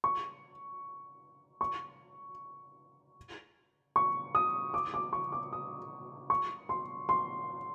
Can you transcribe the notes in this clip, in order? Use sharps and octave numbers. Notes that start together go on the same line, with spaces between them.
C#6
C#6
C#6
D#6
D6
D6
C#6
D6
D#6
C#6
C6
C6